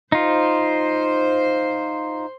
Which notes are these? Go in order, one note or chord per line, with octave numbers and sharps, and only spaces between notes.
D#4 F4 C5